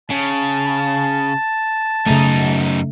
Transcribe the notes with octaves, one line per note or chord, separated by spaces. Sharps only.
C#3 A5
F#2 C#3 A3 D#4